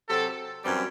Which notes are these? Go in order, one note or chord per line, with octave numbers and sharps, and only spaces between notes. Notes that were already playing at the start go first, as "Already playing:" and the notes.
C3 F#3 C4 G4 A4
F#2 E3 G3 C4